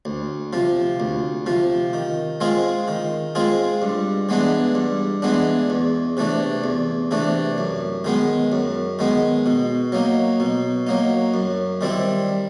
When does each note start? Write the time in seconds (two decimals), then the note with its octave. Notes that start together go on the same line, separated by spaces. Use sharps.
0.05 D2
0.53 C3 F3
1.00 D2
1.46 C3 F3
1.93 D#3
2.41 G#3 C4 F4 G#4
2.88 D#3
3.35 G#3 C4 F4 G#4
3.82 G2
4.29 E3 G#3 B3 D4
4.75 G2
5.22 E3 G#3 B3 D4
5.70 E2
6.17 C3 E3 A3 D4
6.64 E2
7.11 C3 E3 A3 D4
7.58 F#2
8.04 D#3 G#3 B3
8.52 F#2
8.99 D#3 G#3 B3
9.46 B2
9.92 F#3 A#3 D#4
10.40 B2
10.87 F#3 A#3 D#4
11.34 F#2
11.81 D#3 G3 C4 E4